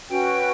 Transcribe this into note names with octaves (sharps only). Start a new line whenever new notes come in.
C#4 F#4 B4 G5